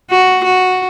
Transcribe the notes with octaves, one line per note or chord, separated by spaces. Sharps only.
F#4
F#4